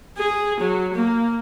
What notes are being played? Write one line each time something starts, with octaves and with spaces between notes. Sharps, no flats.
G#4
F#3
A#3